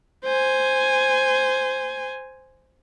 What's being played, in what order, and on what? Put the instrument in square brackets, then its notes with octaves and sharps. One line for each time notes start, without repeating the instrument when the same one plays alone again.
[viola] C5 G#5